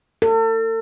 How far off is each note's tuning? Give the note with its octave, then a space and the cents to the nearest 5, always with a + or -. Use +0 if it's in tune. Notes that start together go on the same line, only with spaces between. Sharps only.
A4 +40